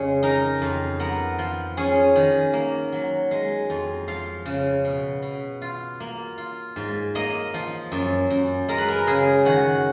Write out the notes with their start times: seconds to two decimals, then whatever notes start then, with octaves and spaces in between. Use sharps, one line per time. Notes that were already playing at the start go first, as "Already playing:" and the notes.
Already playing: F2 C#3 G#3 G#4
0.23 D#4 A#4
0.62 F2
1.00 B3 A#4
1.38 F3
1.77 C#4 G#4
2.15 D#3
2.53 A#3
2.92 F#3
3.31 G#3
3.70 F2
4.08 F3 F5
4.45 C#3
4.85 B2
5.22 B2
5.62 F4
6.00 A#3
6.38 F4
6.76 G#2
7.15 A#3 D#5
7.54 F3
7.92 F#2
8.30 F#2
8.68 G#3 A#4
8.78 B4
8.88 A#4
9.07 C#3 G#4
9.45 D#3 F#4